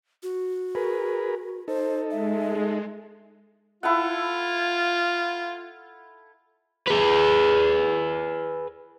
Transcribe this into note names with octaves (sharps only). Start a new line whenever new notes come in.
F#4
G#4 A#4 B4
D#4 A4 C5
G#3 E5
D#4 A4
E4 F4 A4 F#5
G#4 B4